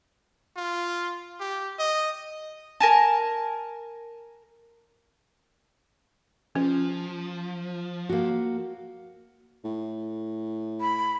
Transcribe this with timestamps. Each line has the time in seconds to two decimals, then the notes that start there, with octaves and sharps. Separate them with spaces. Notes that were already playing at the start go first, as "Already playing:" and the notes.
0.57 F4
1.40 G4
1.79 D#5
2.80 A#4 G#5 A5
6.55 F3 C#4
8.09 A#3 F#4
9.64 A2
10.81 B5